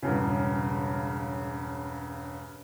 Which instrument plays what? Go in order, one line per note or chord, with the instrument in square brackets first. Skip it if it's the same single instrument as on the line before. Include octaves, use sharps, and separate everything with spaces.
[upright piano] E1 G2 C#3